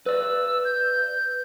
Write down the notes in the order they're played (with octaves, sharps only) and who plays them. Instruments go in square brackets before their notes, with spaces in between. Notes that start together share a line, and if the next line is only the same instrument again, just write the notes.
[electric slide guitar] B4 D5 [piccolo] E6
[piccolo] G6